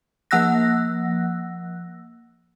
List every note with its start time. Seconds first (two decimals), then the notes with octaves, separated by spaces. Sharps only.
0.31 F3 A#3 F#5 E6 F#6 A#6